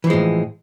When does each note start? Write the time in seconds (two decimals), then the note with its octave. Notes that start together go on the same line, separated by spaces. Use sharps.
0.04 E3
0.07 F3
0.10 G#3
0.13 A2